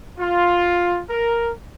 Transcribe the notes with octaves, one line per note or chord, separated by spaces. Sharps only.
F4
A#4